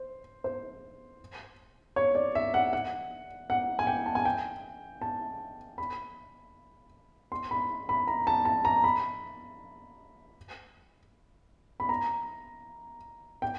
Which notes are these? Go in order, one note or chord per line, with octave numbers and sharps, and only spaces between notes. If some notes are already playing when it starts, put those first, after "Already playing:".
Already playing: C5
C5
C#5
D5
E5
F#5
F#5
F#5
G#5
G5
A5
G#5
G5
A5
B5
C6
B5
B5
A#5
A5
A5
A#5
B5
B5
A#5
G5